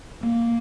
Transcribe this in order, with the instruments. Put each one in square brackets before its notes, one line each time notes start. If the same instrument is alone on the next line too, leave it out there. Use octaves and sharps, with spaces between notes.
[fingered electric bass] A#3